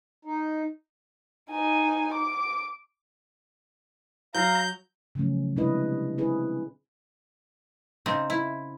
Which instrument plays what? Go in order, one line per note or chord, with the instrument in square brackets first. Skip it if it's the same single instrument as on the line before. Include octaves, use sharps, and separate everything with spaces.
[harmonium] D#4
[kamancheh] D#4 G#5
D6
[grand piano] F#3 [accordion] F5 [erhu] A#5 [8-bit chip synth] G6
[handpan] C#3 F3 F#3 A3 C#4
C3 G#3 D4 E4 B4 D#5
C4 E4 G#4 B4
[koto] C#3 C4 D#4
E4